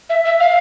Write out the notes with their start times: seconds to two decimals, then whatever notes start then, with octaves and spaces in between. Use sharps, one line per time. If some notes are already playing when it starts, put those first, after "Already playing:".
0.10 E5
0.25 E5
0.40 F5